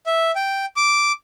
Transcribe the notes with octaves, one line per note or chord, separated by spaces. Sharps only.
E5
G5
D6